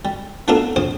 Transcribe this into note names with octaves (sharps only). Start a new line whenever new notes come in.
G3
A3 B3 D4 F4 A4 A#4
A#1 C5 D#6